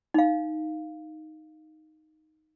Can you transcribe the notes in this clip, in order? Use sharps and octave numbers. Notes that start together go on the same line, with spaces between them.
D#4 F5